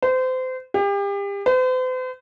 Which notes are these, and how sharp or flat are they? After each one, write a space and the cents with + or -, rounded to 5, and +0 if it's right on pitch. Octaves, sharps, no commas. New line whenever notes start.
C5 -30
G4 +35
C5 -45